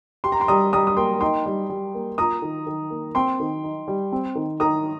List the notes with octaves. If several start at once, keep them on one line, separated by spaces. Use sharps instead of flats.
G4 C6
A#5
G5 C6
G3 A#5 D#6
G3 A#5 D#6
D#6
A#3 G5 C6
D#4 G5 C6
G3
G3
A#3
F4 A#5 D#6
D#3
D#3
A#3
C4 G5 C6
D#3
D#4
G3
C4
D#3
D#3 A#5 D#6